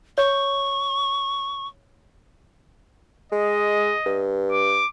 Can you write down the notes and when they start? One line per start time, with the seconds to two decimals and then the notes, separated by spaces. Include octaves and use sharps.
0.18 C#5 C#6
3.32 G#3 D#5
4.06 G2
4.51 D6